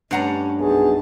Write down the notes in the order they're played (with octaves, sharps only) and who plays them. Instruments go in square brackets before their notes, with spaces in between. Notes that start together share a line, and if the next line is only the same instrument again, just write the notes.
[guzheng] G2 [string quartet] A3 C#4 G4 [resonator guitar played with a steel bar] D4 F#5 A#5
[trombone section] B1 B3 G#4 [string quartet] F#2 B2 A5